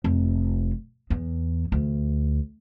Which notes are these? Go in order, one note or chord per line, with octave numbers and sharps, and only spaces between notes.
F1
E2
D2